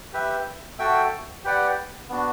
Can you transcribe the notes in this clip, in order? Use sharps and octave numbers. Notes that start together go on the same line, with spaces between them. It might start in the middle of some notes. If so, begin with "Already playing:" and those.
G4 B4 E5
F#4 A4 E5 G5
G4 B4 D5 F#5
B3 D4 F#4